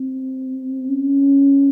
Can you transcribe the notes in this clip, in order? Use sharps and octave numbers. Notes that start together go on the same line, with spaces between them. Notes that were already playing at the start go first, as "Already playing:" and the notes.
Already playing: C4
C#4